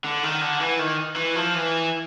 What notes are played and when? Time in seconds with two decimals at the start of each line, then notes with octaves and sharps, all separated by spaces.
0.04 D3
0.23 D#3
0.41 D3
0.61 E3
0.79 D#3
1.16 E3
1.35 F3
1.55 E3